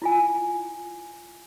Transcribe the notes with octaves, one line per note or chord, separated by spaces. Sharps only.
E4 F4 G#5